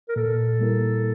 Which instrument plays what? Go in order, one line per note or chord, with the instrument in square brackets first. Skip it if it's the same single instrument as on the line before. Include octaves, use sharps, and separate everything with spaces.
[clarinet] A#4
[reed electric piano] A#2 [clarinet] A4
[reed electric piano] G3 A#3 E4 A#4